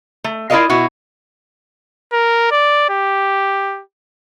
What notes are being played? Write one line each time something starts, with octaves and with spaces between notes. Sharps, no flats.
A3
E4 F4 A#4 D5 D#5 F5
B2 E4 F#4
A#4
D5
G4